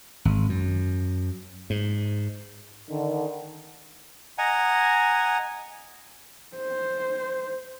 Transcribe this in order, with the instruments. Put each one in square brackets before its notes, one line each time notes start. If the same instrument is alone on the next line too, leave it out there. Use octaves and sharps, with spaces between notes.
[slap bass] G#1
F#2
G#2
[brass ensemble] D3 D#3
[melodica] D#5 F#5 G#5 A#5
[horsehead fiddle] C5